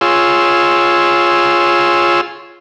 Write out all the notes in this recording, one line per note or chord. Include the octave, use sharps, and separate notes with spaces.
F4 G#4 C#5 C6 E6